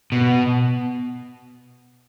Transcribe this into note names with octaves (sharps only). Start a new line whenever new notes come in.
B2